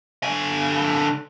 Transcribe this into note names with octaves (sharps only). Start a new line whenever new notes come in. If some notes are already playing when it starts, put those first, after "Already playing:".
D3 G#5